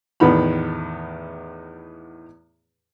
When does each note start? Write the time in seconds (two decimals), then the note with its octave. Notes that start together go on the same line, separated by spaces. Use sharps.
0.20 E2 A2 D#3 B3 B5